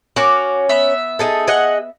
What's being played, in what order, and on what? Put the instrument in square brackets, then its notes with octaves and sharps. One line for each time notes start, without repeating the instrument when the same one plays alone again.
[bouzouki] C#4 A#4 [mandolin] F#4 D6
[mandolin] B3 E5
[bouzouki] D#4 G#4 A4
G#4 D#5 F#5